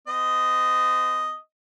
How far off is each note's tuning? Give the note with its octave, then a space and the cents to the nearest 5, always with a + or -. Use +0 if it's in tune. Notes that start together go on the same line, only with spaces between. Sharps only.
C4 -35 D#5 +0